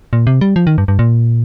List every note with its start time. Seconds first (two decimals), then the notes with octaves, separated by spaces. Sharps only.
0.13 A#2
0.27 C3
0.41 G3
0.56 F3
0.67 D#3
0.78 G2
0.88 G2
0.99 A#2